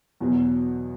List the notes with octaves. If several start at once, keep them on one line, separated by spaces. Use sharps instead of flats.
E2 B2 F#3